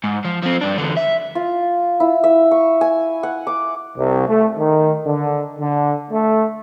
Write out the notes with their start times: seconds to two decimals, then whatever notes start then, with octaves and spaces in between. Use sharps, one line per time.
0.04 G#2
0.25 F3
0.43 F3 C4
0.61 G2 D4
0.78 E2 D3
0.97 E5
1.35 F4
2.00 E4
2.24 E5
2.51 C#6
2.81 G#5
3.23 F#5
3.47 D6
3.97 C2
4.27 A3
4.57 D#3
5.06 D3
5.58 D3
6.10 A3